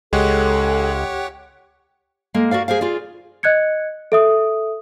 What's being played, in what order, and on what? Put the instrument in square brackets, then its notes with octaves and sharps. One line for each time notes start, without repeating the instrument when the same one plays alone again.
[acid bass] C#2 [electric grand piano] G#3 [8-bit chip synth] G4 C#5 F#5 [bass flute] A4
[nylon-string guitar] G#3 A#3 A4
F#4 A#4 D5 F5
G#4 A#4 C5 F5
F4 G#4 D5
[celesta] D#5 F#6 G#6 C#7
A4 E5 D#6